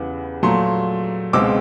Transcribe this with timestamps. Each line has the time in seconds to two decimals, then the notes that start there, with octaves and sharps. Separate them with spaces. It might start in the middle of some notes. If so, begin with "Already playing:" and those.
Already playing: E2 C#3 E3 G3 F#5
0.43 A#2 F#3 A3 A#5 C6
1.33 C#2 B2 G#3 C4 D6 E6